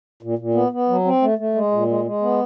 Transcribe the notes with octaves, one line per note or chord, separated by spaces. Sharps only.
A#2
A#2
B3
B3
F#3
C4
A3
A3
G#3
A#2
G#3
G#3
B3